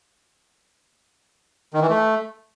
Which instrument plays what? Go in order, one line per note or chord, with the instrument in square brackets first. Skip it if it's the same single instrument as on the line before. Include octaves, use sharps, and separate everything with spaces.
[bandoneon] D#3
E3
A3